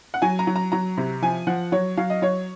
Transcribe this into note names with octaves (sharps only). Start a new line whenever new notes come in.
F#5
F#3 G#5
A#5
F#3
A#5
F#3 A#5
C3
F3 G#5
F3 F#5
F#3 C#5
F#3 F5
D#5
F#3 C#5